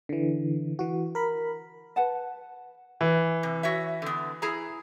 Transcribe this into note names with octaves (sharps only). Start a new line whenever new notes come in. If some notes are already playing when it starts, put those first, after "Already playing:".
D3 E3
E3 F#4
A#4 B5
B4 F#5 A5
E3
C3
F#4 C#5 E5
D3 B3
E4 G#4 A#5